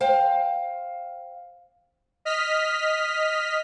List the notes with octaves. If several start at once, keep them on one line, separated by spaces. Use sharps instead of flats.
C5 F5 G5
D#5 F6 B6